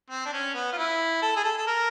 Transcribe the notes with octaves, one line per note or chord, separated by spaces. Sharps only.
C4
D4
C#4
B3
F4
E4
A4
G#4
A4
A4
A#4